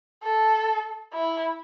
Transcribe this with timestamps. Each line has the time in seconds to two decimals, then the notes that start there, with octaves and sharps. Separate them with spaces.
0.24 A4
1.13 E4